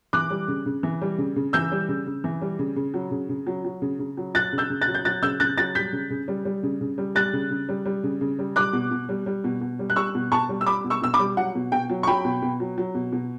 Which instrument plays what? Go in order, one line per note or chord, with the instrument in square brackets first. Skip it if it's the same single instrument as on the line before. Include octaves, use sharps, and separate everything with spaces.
[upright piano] E3 D6 F#6
G3
C#3
C#3
E3
G3
C#3
C#3
E3 E6 G6
G3
C#3
C#3
E3
G3
C#3
C#3
F#3
C#3
C#3
F#3
F#3
C#3
C#3
F#3
F#3 F#6 A6
C#3
E6 G6
C#3
F#6 A6
F#3
G6
F#3 F#6 A6
C#3 E6 G6
C#3 F#6 A6
F#3 F#6 A6
G3 G6 B6
C#3
C#3
G3
G3
C#3
C#3
G3
G3 F#6 A6
C#3
C#3
G3
G3
C#3
C#3
G3
G3 D6 F#6
B2
B2
G3
G3
B2
B2
G3
F#6
G3 C#6 E6
B2
B2 A5 C#6
G3
E6
G3 B5 D6
B2
C#6 E6
B2 E6
B5 D6
G3
F#3 F#5
B2
B2 G5
F#3
C#6
F#3 G5 B5
B2
B2
F#3
F#3
B2
B2